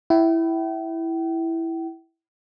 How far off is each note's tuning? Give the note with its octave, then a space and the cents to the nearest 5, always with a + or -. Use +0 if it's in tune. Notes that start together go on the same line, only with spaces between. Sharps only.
E4 +0 G5 -40